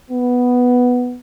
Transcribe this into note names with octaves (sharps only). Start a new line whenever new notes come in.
B3